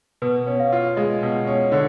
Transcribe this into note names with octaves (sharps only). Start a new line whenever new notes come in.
B2 B4
C#4
F5
F4
G#3 D#5
B2
C#4
D3 C#5